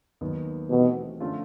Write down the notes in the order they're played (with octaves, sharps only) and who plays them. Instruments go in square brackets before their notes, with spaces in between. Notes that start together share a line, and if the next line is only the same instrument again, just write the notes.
[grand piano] D#2 D#3 F#3 B3
[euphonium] B2 [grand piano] E3 A3 C4 D#4 G4
[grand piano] D3 F3 A3 C#4 F4